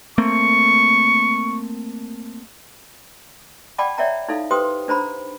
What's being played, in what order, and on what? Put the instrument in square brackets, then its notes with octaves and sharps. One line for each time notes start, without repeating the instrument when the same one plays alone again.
[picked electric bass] A3 A#3 C4 [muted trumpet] C#6
[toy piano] D5 F#5 G5 A5 B5 D6
C#5 D5 E5 F#5 G5 A#5
D#4 E4 A4 F5
G4 B4 C5 G5 C6 D#6
D4 C5 A#5 B5